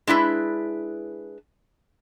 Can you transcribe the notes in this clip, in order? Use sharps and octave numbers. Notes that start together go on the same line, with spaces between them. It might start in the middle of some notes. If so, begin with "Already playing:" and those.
G#3 D4 E4 B4